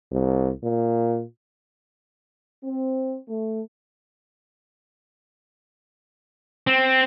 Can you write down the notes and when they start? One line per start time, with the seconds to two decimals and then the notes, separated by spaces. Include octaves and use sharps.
0.12 C2
0.63 A#2
2.64 C4
3.28 A3
6.67 C4